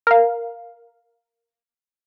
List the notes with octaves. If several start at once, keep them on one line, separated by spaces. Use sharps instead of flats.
A#4 F5